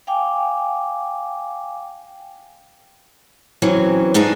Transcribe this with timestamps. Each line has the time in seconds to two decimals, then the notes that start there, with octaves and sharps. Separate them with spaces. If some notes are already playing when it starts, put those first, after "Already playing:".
0.07 F5 G5 G#5 D6
3.62 E3 F#3 C4 C#4
4.14 G#2 D4 D#4 F4 G#4